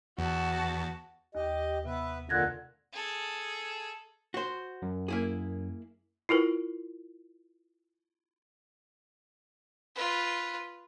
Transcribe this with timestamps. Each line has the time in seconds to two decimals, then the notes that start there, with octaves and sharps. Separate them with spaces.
0.19 E2 F#4 A5
1.35 D#2 G4 D#5
1.85 C3 B3 B4 E5
2.29 F2 A#2 D3 D#3 F#6 G#6 A#6
2.93 G#4 A4
4.34 F#4 C5
4.82 F#2
5.08 A#3 E4 G#4
6.29 E4 F4 A#4 B4
9.95 F4 B4